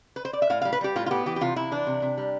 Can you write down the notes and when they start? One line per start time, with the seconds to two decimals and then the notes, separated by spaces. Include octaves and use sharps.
0.16 B4
0.25 C5
0.33 D5
0.42 E5
0.50 A2 F5
0.61 G3 F5
0.73 B4
0.81 G3 G4
0.96 A2 F4
1.06 F4
1.11 B3 G4
1.26 E3 G4
1.36 G4
1.41 C3 F4
1.56 C3 E4
1.71 E3 D4
1.87 C3
2.02 C3
2.18 G3